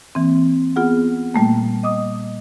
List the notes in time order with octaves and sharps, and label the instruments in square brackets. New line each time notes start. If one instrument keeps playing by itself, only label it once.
[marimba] E3 A#3 C4
B3 F4 G#4 F#5
A#2 G3 A3 A#3
D#5 D6 D#6